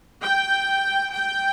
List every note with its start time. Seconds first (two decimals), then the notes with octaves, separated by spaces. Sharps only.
0.22 G5
1.13 G5